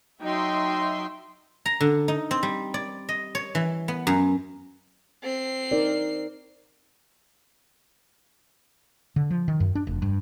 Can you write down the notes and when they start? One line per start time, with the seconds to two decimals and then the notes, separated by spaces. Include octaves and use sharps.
0.22 F#3 D#4 E5 G5 C6
1.66 A#5
1.81 D3
2.08 D#4
2.31 C4
2.43 G3
2.74 D5
3.09 D#5
3.35 C#5
3.55 E3
3.88 B3
4.07 F#2
5.23 C4 C7
5.71 D#4 A#4 D5
9.16 D3
9.30 F3
9.48 D#3
9.60 F#2
9.75 D4
9.87 F1
10.02 G2